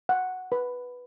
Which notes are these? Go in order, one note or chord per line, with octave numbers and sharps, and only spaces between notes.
F#5
B4